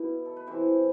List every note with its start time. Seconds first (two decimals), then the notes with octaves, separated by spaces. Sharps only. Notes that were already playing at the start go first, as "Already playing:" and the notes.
Already playing: B2 E4
0.25 A4
0.36 B4
0.47 C3 E3 C5